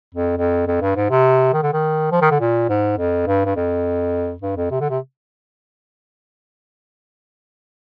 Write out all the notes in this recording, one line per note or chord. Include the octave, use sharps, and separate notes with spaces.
F2
F2
F2
G2
G#2
C3
D#3
D3
D#3
F3
D#3
D3
A#2
G#2
F2
G2
G2
F2
G2
F2
C3
D3
C3